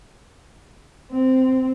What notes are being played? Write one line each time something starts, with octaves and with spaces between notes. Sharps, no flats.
C4